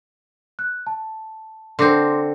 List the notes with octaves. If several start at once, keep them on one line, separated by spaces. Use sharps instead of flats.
F#6
A5
D3 C4 C6 D6 A#6